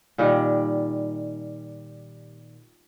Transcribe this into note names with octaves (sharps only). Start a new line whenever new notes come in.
A#2 D#3 G3